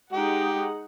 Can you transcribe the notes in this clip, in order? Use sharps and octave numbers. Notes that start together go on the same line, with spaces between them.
G#3 D#4 G4 F#5